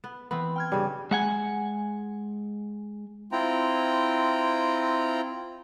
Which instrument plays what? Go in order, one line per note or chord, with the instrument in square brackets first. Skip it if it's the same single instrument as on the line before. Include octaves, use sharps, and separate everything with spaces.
[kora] B3
[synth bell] E3 B5 [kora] B3 C4
[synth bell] G5 F6 G#6
[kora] G2 C#3 [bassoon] G3
[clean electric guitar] G#3 F#5 G#5
[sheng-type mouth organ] C4 E4 F4 G5 A#5